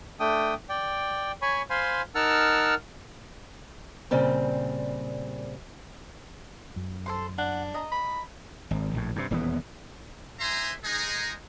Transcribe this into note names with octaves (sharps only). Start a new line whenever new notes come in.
A3 D4 G5 D#6
D5 G5
C#5 G#5 B5 C#6
C5 F5 G#5 B5 C6
D#4 A#4 F#5 A5 E6 F6
A#2 C#3 G3 C4
F#2
A4 C5 C6
D4 F#5
D#5 A#5
B5
G#1
A#1 A2
G2 C3
D#1 E2 G3 B3
D#4 C5 E5 G#5 A#5 C6
G#3 D#4 G#4